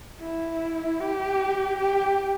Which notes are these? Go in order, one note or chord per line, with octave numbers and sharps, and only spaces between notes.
E4
G4
G4